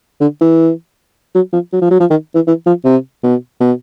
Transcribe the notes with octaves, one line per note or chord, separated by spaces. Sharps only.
D3
E3
F#3
F3
F#3
F3
F#3
F3
D#3
E3
E3
F3
C3
B2
B2